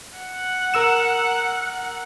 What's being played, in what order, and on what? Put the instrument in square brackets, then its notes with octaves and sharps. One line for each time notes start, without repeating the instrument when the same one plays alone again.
[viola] F#5
[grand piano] A#4 E6 E7